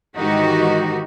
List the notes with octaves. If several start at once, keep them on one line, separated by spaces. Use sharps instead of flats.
G#2 D#3 E3 D#4 F#4 G4